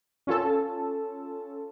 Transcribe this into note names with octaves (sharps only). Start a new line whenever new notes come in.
C#4 F4 A4 A5